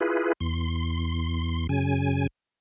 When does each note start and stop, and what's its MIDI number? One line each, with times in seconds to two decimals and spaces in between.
0.01 0.33 64
0.01 0.33 65
0.01 0.33 68
0.01 0.33 71
0.40 1.67 40
0.40 1.67 84
1.69 2.27 42
1.69 2.27 49
1.69 2.27 80